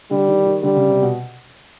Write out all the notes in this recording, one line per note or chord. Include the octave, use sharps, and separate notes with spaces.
D3 G3
D#3
D#3
D3 G3
C#3
C3
B2